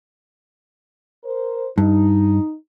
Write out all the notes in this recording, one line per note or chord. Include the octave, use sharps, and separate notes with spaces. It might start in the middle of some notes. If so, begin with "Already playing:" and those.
A#4 C5
G2 D#4